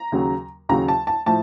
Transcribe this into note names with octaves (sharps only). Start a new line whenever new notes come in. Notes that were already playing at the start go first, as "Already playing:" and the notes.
Already playing: A#5
D#2 C#3 F#3
D#2 C#3 F#3 A#5
A5
A5
A2 F3 A5